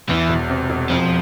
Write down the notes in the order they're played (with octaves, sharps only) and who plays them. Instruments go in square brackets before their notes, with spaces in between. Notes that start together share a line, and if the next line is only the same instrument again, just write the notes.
[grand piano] E2 [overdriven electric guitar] E3
[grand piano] E1
C3
E1
[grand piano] F2 [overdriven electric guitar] F3